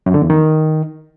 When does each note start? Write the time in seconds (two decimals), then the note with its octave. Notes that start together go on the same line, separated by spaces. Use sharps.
0.06 F#2
0.14 D3
0.22 E2
0.30 D#3